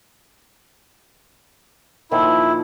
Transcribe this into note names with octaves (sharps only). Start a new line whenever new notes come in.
A#2 D#3 F3 E4